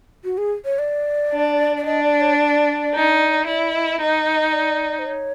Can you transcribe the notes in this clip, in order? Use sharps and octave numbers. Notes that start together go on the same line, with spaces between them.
F#4
G#4
C#5
D5
D4
D5
D4 D#5
D5
C#5
D5
D#4
E4 D5
D#5
D#4 D#5
D5
C5
C#5